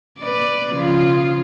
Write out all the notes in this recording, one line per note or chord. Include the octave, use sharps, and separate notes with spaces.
B4 D5
C#3 F3 F4